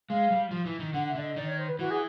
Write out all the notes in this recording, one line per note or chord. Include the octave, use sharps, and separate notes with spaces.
G#3 F5
G3
F3
E3
D#3
D3 F#5
E5
D3 D5
D#5
D#3 D5
C#5
C5
B4
E3 F#4
G#4